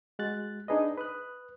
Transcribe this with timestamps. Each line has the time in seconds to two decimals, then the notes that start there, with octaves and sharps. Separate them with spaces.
0.19 G#3 F#4 F#6 A6
0.68 D4 D#4 G#4 B4 D#5
0.97 B4 D#6 F#6